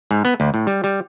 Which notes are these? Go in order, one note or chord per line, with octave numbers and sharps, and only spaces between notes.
G#2
B3
D2
A2
G3
G3